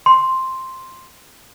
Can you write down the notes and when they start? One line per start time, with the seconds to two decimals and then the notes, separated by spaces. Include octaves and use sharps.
0.06 C6